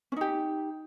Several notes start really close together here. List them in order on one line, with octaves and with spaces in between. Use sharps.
C#4 D#4 G4